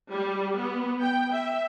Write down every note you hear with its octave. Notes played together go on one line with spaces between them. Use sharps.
G3
B3
G5
E5